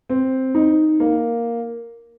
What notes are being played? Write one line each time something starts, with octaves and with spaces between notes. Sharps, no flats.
C4
D#4
A#3